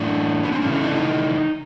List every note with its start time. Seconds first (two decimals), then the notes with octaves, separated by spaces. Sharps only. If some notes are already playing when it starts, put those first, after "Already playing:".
Already playing: A2 E3 A3 D4
0.43 B3
0.52 C4
0.62 C#3 E3 A3 C#4
0.73 C#4
0.80 D#4
0.85 D4
0.96 D#4